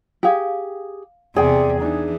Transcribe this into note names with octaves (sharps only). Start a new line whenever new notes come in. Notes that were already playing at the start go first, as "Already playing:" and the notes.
G4 G#4 F5 G#5
E2 C3 G#4 D5 G5
E3 D4 D#4